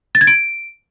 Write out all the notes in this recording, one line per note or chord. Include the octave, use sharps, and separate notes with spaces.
A6
G#6
D7